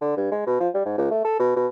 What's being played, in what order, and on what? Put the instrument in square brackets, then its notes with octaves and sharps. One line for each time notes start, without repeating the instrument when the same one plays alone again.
[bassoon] D3
G2
G#3
B2
F3
G3
G#2
C#2
A3
A4
B2
B2